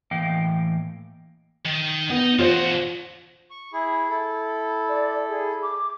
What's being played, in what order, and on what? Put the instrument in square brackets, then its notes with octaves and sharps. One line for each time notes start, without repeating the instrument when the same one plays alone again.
[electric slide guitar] A2 E3 A#3 D#5 F5 G5
[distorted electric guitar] D#3
[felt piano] B3 [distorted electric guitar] D#4 D#5
[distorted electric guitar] E2 F#4 [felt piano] F4 C5
[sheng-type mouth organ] C#6
E4 G#4
E4 A4
[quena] D5
G#4
D6